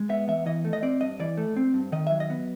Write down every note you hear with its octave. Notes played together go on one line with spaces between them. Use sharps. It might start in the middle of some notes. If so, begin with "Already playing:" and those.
Already playing: G#3
B3 E5
E2 E5
E3 D#5
A3
D#5
C4 D5
G2 D#5
E3 D5
A3
C4
G2
D#3 D#5
F#3 E5
D#5
B3